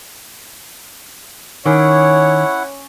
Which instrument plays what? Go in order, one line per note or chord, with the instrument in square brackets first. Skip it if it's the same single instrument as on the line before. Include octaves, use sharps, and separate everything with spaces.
[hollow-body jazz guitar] D#3 [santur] C#4 D6 E6 [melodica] E4 F#5 [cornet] C#5